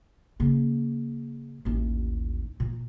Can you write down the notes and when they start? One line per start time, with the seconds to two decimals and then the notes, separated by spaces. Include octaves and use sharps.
0.40 C#3 A#3
1.65 A1 D#2
2.60 A#2